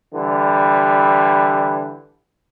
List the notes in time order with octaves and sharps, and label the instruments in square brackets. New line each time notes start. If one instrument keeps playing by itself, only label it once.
[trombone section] D3 E3 G3